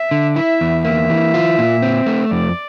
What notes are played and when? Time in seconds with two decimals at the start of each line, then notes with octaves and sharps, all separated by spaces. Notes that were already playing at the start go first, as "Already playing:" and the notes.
Already playing: E5
0.11 D3
0.36 E4 E5
0.61 E2
0.85 A#3 E5
1.10 E3
1.34 F4
1.58 A#2
1.82 C4
2.06 A3
2.31 F2 D5